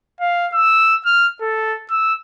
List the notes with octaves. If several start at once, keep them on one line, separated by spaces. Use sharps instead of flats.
F5
E6
F6
A4
E6